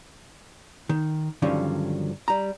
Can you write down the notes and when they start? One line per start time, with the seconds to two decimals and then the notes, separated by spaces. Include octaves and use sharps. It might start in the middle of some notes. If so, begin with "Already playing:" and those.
0.89 D#3
1.42 G2 D3 D#3 F3 F#3 C#4
2.28 G3 A#5